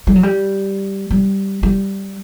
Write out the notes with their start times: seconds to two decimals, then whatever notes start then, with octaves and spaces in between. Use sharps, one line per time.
0.07 G3
0.15 F#3
0.23 G3
1.11 G3
1.63 G3